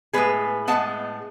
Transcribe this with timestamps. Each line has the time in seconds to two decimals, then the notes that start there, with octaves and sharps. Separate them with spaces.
0.13 A2 G#3 B3 G#4 B4
0.68 A2 G#3 B3 F#5 A5